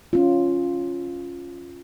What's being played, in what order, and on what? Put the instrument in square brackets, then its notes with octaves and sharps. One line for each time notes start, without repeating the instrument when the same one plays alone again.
[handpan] C#4 F4